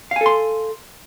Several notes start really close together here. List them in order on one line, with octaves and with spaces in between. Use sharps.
F5 G#5 A4 C6